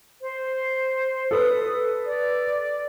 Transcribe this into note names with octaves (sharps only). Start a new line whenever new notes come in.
C5
A4 B4 D#6
D5